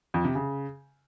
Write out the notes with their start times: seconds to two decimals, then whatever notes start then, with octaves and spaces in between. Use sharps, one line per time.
0.14 F2
0.25 C3
0.35 C#3